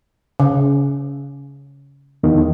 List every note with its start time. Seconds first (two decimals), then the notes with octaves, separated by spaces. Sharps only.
0.40 C#3
2.23 E2 D#3